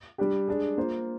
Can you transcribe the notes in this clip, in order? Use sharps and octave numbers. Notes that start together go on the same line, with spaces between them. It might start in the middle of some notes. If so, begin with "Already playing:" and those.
G3 D4 G4
G#3 D4 G#4
A#3 F4 C5